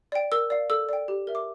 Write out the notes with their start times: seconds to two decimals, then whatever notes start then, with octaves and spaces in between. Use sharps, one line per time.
0.12 D5 G5
0.32 A#4 E6
0.50 D5 F5
0.70 A4 E6
0.89 D5 G5
1.08 G4
1.27 A#4 E5
1.35 D6